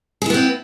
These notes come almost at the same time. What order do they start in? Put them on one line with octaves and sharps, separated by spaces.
G#4 E4 B3 C4